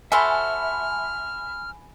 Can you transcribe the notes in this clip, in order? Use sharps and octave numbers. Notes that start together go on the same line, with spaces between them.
F#4 A4 C5 E5 G#5 B5 F6